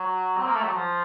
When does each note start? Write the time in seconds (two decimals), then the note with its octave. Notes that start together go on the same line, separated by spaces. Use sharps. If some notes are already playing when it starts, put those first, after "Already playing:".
Already playing: F#3
0.37 C4
0.46 A#3
0.55 A3
0.64 F#3
0.74 F3